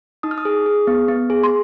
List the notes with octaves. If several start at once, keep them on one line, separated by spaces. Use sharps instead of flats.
D#4 D#6
F6
D#6
G#4
G#4
B3
B3
G#4
C6